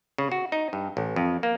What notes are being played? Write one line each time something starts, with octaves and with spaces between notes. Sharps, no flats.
C#3
F#4
D#4
G2
A1
F2
A#3